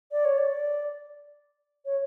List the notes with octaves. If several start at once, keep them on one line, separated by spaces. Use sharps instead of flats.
D5
C#5
D5
C#5